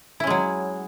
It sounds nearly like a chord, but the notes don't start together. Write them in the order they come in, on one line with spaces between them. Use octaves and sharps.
E4 C#4 G#3 F#3